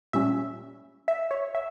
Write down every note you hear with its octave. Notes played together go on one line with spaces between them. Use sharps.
A#2 G3 C#4 E5
E5
C#5
E5